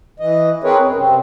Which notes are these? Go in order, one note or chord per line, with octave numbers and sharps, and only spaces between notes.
E3 D#5
C4 G#4 A#4 B4 C#5
F#2
C3 C4